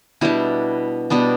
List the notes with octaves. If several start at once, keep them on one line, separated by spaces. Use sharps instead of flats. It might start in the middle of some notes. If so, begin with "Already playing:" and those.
B2 G3 B3 D4 E4
B2 G3 B3 D4